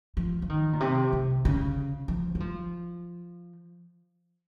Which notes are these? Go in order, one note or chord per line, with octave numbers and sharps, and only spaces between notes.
F3
F3
D#3
A#2
C3
C3
C#3
F3
F#3
F3